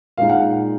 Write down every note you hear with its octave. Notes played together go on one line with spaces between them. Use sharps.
A#2 G#3 D#4 F5
F#5